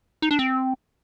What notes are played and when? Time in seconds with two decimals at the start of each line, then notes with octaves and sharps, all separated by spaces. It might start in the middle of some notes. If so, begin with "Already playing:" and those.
0.22 D#4
0.31 D4
0.39 C4